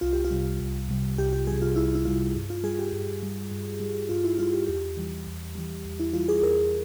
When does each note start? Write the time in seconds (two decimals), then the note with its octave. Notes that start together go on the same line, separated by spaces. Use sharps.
0.01 C2 F4
0.13 G4
0.25 F4
0.31 C3 G3
0.60 C2
0.89 C3 G3
1.18 C2 G4
1.33 G4
1.47 G3 G#4
1.53 C3
1.62 F4
1.76 C2 E4
1.95 E4
2.05 C3 G3 F4
2.35 G2
2.50 F4
2.63 G3 G#4
2.79 G4
2.93 G2
3.23 G3
3.51 G2
3.80 G3
4.09 G2 F4
4.24 E4
4.39 G3 F4
4.53 G4
4.67 E2 G4
4.97 E3 G3
5.27 E2
5.55 E3 G3
5.85 E2
6.00 E4
6.13 E3 G3 F4
6.28 G#4
6.42 E2 A#4